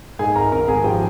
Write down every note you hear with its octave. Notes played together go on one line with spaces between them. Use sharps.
G#2 G#4 G#5
G#1 A#4 A#5
G#1 A#4 A#5
G#1 G#4 G#5
F3 G4 G5